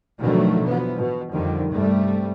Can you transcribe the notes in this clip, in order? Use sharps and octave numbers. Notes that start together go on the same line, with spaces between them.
B2 D3 D#3 F3 F#3 A3
E3 F3 B3
B2
F2 D3 D#3 F3 G3
G2 C3 G3 A3